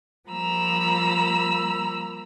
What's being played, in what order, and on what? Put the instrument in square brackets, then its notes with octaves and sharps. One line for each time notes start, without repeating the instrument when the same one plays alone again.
[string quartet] F3 G3 A#3 A#5 B5 E6